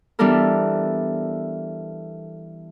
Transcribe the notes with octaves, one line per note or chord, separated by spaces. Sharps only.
E3 G3 B3 D4 A4 A#4